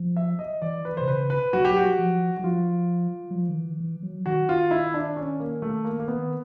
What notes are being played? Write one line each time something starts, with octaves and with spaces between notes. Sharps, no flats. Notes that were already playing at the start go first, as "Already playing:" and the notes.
Already playing: F3
E5
D#5
E3 D5
B4
C3 C5
C#3 B4
B4
F#3 F#4
G4
F#4
F3
F#3 F#4
F3 F4
F#3
F3
D#3
E3
E3
F#3
D#3 F#4
F4
E4
D4
C#4
A#3
A3
A#3
A#3
B3